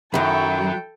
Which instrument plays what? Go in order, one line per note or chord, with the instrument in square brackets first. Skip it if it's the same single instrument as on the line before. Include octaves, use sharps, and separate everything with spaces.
[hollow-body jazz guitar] F#2 D#3 [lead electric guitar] F#3 [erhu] E4 [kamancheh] A4 G5